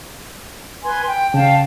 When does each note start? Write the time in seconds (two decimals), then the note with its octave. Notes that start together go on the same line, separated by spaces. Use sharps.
0.84 B4 G#5 C6
1.06 G5
1.34 C#3 F5 G5 A5